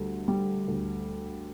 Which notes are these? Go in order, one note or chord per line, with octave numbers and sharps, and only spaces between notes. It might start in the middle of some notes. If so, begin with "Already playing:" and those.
Already playing: D2 G3
G3
D2